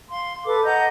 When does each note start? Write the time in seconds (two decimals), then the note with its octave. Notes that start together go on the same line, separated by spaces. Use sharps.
0.10 F5 C6
0.45 A4 B4 D6
0.64 D#5 F#5 A#5 G6